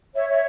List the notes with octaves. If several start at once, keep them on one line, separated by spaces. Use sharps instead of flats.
C#5 E5
C#5 E5